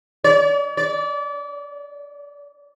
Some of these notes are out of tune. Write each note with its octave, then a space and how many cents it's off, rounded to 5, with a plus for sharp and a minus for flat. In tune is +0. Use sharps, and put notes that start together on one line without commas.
D5 -45
D5 -30